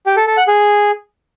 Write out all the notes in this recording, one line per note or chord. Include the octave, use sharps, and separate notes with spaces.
G4
A4
A4
F#5
G#4